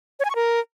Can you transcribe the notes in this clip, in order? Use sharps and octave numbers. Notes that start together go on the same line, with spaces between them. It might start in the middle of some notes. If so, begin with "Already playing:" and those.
C#5
G#5
C#6
A#4